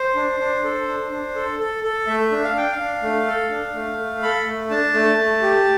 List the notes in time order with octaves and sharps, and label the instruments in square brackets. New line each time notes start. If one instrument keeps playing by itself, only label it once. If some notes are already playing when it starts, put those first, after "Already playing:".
Already playing: [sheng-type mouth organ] C5
D4
D4
A4
D4
D4
A4
A4
A4
A3 E5
D4
F5
D4 G5
F5
D4
A3
A4
D4
A3
A3
A4 B5
A3
D4 A5
A3
A3
G4